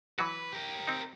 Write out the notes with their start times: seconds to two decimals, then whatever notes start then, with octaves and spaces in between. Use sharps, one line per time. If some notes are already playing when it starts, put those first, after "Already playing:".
0.19 E3 F#3 F#4 B4
0.52 G4 A#4
0.87 C4 D#4